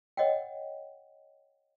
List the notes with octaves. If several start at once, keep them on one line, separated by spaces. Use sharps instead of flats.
C#5 D#5 F#5 G5